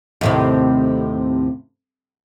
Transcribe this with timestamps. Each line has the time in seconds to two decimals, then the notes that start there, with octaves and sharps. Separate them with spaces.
0.21 D#2 A2 C3